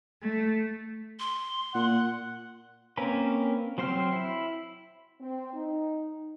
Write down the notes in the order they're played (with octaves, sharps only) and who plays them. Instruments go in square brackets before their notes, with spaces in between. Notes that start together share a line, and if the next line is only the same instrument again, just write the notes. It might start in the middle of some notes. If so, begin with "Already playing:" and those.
[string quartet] A3
[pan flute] C6
[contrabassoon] A#2 [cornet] F#5
[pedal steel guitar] A#3 C4 C#4 A#4 B4
F#3 C4 C5 G5 F6
E4
[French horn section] C4
D#4